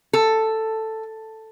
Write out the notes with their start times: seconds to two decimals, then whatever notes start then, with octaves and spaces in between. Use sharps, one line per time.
0.13 A4